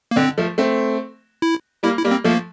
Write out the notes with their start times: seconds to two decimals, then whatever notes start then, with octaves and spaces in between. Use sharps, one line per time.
0.11 A#3
0.16 D3 C4
0.38 F3 A3
0.58 A3 C4
1.42 E4
1.83 G3 A#3 E4
1.97 E4
2.04 G3 A#3
2.11 C4
2.24 F3 A3 A#3